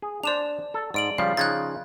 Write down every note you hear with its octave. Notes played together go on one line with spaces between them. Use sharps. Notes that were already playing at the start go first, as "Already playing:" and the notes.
G#4
D4 C5 D5 E7 F7
A4
G#2 D5 D7 F#7
C#3 F3 G3 F5
C#3 F3 D#4 F#6 G#6 A6